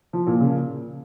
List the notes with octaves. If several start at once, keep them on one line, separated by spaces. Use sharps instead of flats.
F3
A#2
C#3